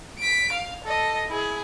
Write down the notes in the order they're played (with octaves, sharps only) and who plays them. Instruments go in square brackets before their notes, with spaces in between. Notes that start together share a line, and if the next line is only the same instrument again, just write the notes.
[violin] B6 D7
F5
A4 D#5
E4 G#4